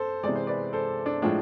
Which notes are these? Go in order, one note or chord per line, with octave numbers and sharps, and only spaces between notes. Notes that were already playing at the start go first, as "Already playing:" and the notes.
Already playing: A4 C5
C3 E3 G#3 D5
C5
B4 D5
A4 C5
D4
A2 F3 G#3 D4